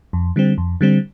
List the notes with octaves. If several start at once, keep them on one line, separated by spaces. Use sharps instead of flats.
F2
D3 G3 C4
F2
D3 G3 C4